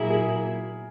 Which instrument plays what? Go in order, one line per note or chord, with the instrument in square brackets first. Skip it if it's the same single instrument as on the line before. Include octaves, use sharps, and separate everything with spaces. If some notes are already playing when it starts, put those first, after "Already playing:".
Already playing: [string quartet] A#2 F#3 A#3 E4 [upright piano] G#4 A#4
[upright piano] G#4